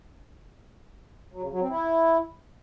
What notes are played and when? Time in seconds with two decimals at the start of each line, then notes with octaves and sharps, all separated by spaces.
1.33 F#3
1.42 C#3
1.51 F#3
1.61 C4
1.70 E4